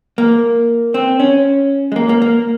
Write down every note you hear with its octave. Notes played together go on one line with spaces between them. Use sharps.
A#3
C4
C#4
G#3
A#3
A#3
A#3